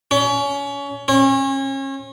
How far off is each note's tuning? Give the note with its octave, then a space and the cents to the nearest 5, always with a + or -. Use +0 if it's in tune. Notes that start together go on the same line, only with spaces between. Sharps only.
C#4 +25
C#4 -35